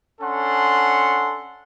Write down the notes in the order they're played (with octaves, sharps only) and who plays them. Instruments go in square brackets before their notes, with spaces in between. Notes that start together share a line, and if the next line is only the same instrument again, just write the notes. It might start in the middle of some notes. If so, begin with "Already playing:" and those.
[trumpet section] C#4 D4 A4 F#5 C6